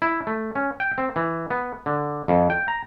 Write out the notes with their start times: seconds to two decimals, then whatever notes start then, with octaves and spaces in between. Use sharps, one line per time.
0.02 E4
0.27 A3
0.55 C#4
0.80 G5
0.98 C4
1.16 E3
1.50 B3
1.86 D3
2.28 F2
2.50 G5
2.68 A#5